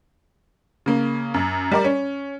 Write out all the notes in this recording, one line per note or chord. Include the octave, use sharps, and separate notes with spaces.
C#3 A#3
F#2
G3 A#4 D5
C#4